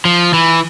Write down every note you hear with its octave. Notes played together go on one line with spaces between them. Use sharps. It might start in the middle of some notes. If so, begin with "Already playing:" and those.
F3
E3